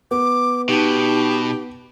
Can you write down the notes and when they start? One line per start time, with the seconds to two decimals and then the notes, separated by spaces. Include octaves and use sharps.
0.11 B3 D6
0.69 B2 D#4 G4 A5